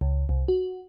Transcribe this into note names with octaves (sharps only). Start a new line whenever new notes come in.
C#2
C2
F#4